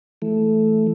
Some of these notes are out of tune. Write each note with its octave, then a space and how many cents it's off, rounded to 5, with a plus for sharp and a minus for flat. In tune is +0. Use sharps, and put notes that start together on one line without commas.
E3 +0 A3 -10